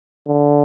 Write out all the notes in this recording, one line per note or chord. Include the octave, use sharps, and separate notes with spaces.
D3